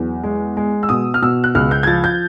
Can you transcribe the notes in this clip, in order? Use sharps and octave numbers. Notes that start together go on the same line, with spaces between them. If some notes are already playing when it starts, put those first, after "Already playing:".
Already playing: E2 F#3
G#3
G#3
E6
B2 D#6
F6
B2 E6
F#6
C#2 F6
G6
G#6
F3 A6
G6